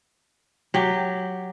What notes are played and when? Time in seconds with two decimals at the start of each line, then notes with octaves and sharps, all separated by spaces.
0.74 F#3 G4